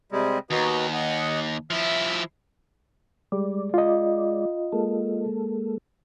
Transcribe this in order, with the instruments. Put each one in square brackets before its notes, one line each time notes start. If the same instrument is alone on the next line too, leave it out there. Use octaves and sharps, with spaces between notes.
[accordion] C3 G3 G#3
[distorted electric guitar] D#2 [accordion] B3 D#4 F#4
[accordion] D#5 F#5
[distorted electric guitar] F3 E4 [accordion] E5
[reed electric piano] G3 [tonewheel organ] G#3 D5
[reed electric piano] F4 D#5
[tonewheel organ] G#3 A#3 A4